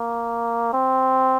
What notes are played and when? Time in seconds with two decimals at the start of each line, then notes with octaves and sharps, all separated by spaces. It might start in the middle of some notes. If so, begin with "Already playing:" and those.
Already playing: A#3
0.73 C4